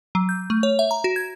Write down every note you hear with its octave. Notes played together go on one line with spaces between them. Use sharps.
F#3
G6
A3
C#5
E5
A#5
F#4
G#6